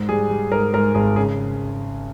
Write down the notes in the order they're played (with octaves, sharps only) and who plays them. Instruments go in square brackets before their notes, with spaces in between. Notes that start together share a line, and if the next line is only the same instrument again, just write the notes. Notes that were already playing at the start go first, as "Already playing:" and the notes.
Already playing: [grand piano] G#2
G3 G#4
G3
G#2 A#4
G#2 A#4
G#1 G#4
C#3 G#4